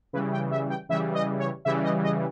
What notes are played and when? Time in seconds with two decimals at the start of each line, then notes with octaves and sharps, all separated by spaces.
0.13 C#3 E3 G3 B4
0.32 G5
0.51 E5
0.70 G5
0.89 C#3 E3 G3 E5
1.14 D#5
1.39 C#5
1.65 C#3 E3 G3 E5
1.84 D#5
2.04 D#5